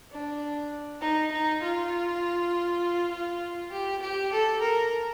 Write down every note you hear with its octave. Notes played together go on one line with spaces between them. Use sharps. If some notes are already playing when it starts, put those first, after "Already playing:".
D4
D#4
D#4
F4
F4
G4
G4
A4
A#4